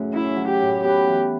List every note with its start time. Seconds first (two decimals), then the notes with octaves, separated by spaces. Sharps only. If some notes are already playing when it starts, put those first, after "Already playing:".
Already playing: F#2 A2 C#3 F#3
0.13 C#4 E4
0.36 F#3
0.48 G4
0.60 A2
0.84 B3 G4
1.07 E3